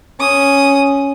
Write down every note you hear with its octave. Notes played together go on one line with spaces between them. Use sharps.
C#4 D#6